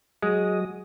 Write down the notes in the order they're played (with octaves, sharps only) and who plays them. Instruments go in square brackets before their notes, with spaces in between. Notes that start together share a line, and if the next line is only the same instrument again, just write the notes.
[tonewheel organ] F#3 D#5 [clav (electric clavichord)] G#3